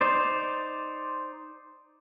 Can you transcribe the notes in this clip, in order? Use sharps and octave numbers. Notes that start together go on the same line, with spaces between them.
D#4 C5 D5